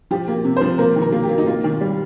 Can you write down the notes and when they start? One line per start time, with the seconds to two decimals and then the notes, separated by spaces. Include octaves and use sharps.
0.11 F3 G4
0.28 A#3
0.45 C3
0.57 F3 C5
0.78 A#3 A#4
0.96 D#3
1.02 A#4
1.13 A#3
1.23 G4
1.29 A#3
1.38 D#4
1.46 A#3 F4
1.64 D#3
1.81 G3